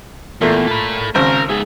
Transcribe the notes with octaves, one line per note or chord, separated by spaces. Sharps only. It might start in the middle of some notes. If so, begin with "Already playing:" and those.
E2 A#2 A3
A4 B5
G#1 C#3 A#4 C5
G#2 G#4 E5